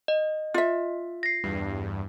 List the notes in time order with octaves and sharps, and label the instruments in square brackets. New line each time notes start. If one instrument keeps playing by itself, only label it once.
[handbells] D#5
[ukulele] F4 E5
[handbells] A#6 C7
[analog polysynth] E2 G2